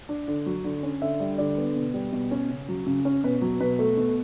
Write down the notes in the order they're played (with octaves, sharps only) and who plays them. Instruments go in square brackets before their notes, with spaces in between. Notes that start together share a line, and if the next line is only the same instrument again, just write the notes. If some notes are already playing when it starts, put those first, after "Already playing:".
[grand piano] D4
D3
F#3
D3
C#4
D3 E5
G3
D3 D5
B3
B2
G3
B2
C#4
C#3
F#3
C#3
C#4
B2 B4
F#3
B2 B4
A3
B2